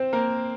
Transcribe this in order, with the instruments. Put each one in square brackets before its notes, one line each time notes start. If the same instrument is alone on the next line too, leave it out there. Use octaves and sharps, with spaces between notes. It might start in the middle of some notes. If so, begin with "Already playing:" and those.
Already playing: [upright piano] C4 C5
A#3 A#4